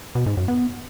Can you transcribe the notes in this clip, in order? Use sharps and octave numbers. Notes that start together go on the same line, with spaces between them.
B2
G#2
F#2
B3